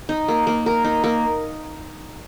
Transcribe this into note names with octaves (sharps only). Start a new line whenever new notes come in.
D#4
A#3
A#3
A#4
D#4
A#3